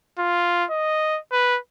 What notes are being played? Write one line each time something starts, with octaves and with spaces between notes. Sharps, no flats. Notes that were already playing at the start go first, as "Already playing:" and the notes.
F4
D#5
B4